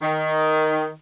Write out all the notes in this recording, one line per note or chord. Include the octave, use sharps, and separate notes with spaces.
D#3